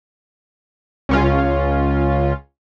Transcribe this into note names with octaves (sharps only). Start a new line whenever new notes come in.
C#2 C#4 F4